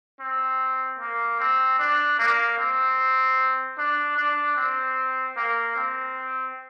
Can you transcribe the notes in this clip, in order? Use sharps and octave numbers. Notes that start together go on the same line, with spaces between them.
C4
A#3
C4
D4
A#3
C4
D4
D4
C4
A#3
C4